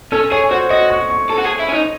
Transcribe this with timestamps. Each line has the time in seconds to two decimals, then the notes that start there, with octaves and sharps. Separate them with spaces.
0.12 C#4 A4
0.32 G#4 C#5
0.51 F#4 C5
0.70 F#4 D#5
0.90 C#6
1.10 C#6
1.30 A4
1.38 F#4
1.44 G#4
1.59 E4
1.68 C#4
1.74 D#4